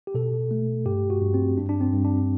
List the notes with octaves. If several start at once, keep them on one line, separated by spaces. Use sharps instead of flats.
G4
B2 A4
A3
G2 G4
F#4
G2
C4
G2 D4
D4
C4
G2
D4